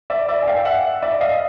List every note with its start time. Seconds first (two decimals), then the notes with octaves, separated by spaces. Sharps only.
0.10 D5 E5
0.29 D5 E5
0.42 G#5
0.47 F5 G5
0.65 E5 F#5
1.02 D5 E5
1.21 D#5 F5